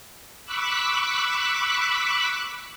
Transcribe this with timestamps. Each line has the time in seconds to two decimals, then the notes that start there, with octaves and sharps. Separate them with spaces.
0.45 B5 C#6 D6 E6 F#6 B6